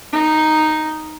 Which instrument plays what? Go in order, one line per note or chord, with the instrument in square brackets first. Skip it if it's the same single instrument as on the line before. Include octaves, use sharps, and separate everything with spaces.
[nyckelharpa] D#4